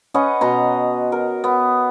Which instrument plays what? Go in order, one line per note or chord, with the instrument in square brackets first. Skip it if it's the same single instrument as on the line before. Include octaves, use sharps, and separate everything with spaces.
[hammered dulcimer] C#4 B4 D#5 F#5
B2 A#5 C6
A#4
B3